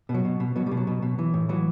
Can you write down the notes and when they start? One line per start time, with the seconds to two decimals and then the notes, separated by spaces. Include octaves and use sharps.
0.09 B2
0.14 F#3
0.25 B2
0.40 B2
0.56 B2 F#3
0.66 G3
0.71 B2
0.77 F#3
0.87 B2
1.02 B2
1.19 E3
1.34 A2
1.49 E3 F#3